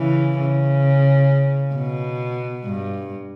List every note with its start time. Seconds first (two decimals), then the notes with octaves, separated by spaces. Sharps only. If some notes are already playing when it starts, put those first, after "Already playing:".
Already playing: C#3 E3
0.39 C#3
1.75 B2
2.65 G2